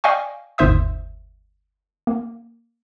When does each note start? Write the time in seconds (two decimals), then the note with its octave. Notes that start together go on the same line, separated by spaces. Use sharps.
0.04 D5 D#5 F5 G5 G#5 C#6
0.58 G1 D#2 G#2 C5 E5 D#6
2.07 A#3